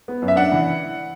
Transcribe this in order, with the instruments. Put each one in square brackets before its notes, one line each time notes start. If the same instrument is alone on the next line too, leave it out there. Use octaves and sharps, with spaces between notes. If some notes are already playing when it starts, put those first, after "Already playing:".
[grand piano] B3
F#2
E5
D4 F#5
E3